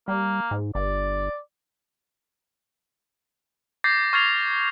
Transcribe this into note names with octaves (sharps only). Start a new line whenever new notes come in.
G3 A#3
G#2
G1 D5
D6 G6 A6 A#6 C7
C#6 F6 G#6 A6 C7 F7